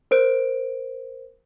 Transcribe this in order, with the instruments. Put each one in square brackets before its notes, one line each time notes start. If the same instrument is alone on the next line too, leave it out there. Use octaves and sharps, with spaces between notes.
[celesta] A#4 C5 D7